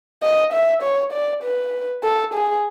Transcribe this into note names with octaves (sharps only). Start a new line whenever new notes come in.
D#5
E5
C#5
D5
B4
A4
G#4